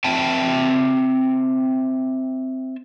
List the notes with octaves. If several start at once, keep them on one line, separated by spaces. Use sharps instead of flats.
C4 E5 G5 A5